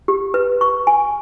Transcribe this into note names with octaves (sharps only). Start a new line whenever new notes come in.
G4
B4
C#6
G#5